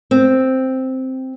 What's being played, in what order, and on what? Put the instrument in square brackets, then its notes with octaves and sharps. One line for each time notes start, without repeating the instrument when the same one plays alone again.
[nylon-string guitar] C4